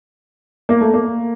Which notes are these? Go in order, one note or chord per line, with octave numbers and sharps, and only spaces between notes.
A#3
A3
A#3